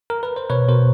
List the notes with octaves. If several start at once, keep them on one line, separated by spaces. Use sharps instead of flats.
A#4
B4
C5
B2 B4 C#5
B2 A#4 C5